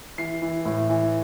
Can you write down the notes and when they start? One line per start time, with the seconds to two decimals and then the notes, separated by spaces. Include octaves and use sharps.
0.18 E3 C7
0.42 E3
0.65 A2
0.89 E3